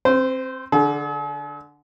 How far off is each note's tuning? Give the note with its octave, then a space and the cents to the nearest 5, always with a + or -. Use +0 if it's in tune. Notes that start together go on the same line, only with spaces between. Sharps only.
C4 +20 C5 -25
D3 +0 G#4 +45